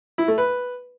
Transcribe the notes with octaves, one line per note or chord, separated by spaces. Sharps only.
E4
A3
B4